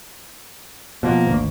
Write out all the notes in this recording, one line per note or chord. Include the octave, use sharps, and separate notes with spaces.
B2 F3 A#3
G#1 D2